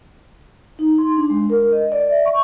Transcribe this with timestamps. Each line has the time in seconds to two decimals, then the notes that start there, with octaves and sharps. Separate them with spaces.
0.79 D#4
0.98 C6
1.17 D4
1.30 G#3
1.50 A#4
1.72 D#5
1.92 D5
2.10 E5
2.26 C#6